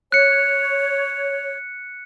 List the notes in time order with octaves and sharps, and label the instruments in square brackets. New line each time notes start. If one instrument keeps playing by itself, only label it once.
[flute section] C#5 [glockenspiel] F#6 C#7